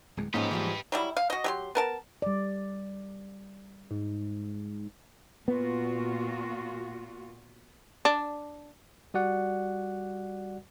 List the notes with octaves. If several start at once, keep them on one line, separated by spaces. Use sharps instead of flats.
D1 E2 G#3
G#2 F3 A#3 C#4 D#4 G4 B4
E3 F3 G3
F#3 G3 E4
F5
F#4 D#5
F#3 G4 C6
B3 A#4 A5
G3 D5
G#2
A#2 B3 F4 F#4
D4
G3 F#4 D5 F#5